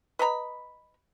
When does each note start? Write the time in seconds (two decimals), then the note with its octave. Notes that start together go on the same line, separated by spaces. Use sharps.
0.19 B4 D#5 A#5 B5